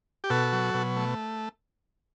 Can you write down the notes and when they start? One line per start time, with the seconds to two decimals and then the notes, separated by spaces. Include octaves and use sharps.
0.24 G4
0.30 B2 F#4 A4
0.53 F#3
0.74 B2
0.97 A3